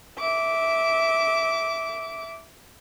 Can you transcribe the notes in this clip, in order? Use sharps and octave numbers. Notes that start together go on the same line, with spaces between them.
E5 D6